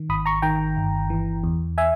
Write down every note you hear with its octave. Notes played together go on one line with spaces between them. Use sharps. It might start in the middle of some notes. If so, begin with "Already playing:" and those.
Already playing: D#3
G#1 B5 D#6
A#5 C#6
D#3 G5 A#5
G1
E3
E2
E5 G#5